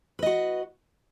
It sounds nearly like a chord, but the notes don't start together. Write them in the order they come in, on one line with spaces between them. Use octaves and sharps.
B4 D#5 F#4